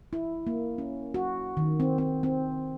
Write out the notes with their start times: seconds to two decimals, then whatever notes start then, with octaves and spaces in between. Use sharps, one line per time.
0.13 E4
0.47 A#3
0.78 C#4
1.14 F#4
1.57 D#3
1.80 C4
1.98 C4
2.23 C4